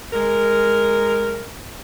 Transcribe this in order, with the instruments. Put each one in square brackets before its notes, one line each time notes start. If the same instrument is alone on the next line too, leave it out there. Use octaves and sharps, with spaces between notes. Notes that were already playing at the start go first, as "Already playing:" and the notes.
[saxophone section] G#3 A#4